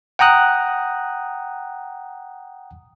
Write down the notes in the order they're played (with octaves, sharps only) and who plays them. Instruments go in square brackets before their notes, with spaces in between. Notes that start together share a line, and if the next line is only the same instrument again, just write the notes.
[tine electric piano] F#5 G5 A#5 D#6 F#6